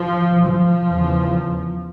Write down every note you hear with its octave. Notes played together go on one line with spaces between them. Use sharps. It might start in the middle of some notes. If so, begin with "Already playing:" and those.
Already playing: F3
F3
E2 C#3